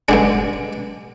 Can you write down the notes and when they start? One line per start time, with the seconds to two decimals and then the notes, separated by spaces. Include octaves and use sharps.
0.09 G2 D3 G#3 D4